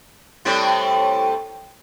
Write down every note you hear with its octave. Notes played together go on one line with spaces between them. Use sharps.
A2 G3 C4